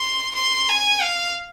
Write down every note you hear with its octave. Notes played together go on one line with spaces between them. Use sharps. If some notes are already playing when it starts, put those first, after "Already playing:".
Already playing: C6
C6
G#5
F5